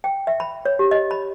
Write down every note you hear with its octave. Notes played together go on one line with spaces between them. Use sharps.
G5
E5
B5
C#5
G4
D#5
B5